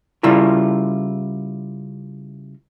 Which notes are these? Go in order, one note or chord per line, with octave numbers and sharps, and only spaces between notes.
C#3 G3 E4 F4 A#4